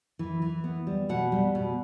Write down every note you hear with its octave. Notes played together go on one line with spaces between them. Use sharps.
E3
E3
B3
G3
B2 F#5
G3
B2